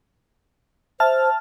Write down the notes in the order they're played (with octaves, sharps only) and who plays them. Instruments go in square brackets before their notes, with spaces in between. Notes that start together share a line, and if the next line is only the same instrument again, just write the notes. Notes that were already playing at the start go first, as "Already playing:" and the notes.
[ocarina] C5 [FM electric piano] E5 A5 F6